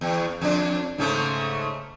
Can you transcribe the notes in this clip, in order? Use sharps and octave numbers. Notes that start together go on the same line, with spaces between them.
E2
F2 D4
G#2 C#3 A3